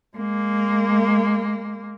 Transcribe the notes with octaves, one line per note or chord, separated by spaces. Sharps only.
G#3 A#3